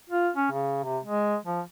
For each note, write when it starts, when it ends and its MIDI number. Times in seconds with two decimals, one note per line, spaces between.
0.10 0.29 65
0.36 0.48 61
0.51 0.78 49
0.84 0.99 48
1.04 1.36 56
1.45 1.61 53